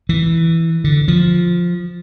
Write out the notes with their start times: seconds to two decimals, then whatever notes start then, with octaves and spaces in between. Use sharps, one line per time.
0.09 E3
0.84 D3
1.08 F3